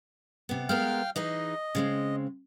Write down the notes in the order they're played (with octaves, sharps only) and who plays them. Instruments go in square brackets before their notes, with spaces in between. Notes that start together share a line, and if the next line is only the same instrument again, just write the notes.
[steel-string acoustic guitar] C3 B3
[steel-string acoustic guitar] G#3 B3 A#4 [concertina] F5 G5 F6
[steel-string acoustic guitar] E3 D#4 G#4 [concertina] D#5
[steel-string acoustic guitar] C#3 G#3 C4